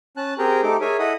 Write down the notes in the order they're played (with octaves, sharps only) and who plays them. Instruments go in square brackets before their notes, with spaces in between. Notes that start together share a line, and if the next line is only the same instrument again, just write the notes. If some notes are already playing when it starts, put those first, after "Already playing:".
[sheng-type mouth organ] C#4 A5 F#6
C4 G4 G#4 A#4 G5 A#5
A3 D#4 G4 A4 D6
G#4 A#4 C#5 E5 G#5
E4 A4 D#5 F#5 B5 D#6